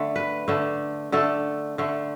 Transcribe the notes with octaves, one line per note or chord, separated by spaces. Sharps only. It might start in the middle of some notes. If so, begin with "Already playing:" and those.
Already playing: D3 A3
B4
D3 A3
D3 A3 A4
D3 A3